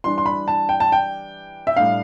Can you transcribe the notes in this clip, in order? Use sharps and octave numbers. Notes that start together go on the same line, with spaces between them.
E3 G3 D4 C6
C6
B5
A5
G5
A5
G5
E5
A2 G3 D4 F5